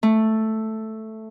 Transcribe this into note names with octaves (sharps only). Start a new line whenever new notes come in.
A3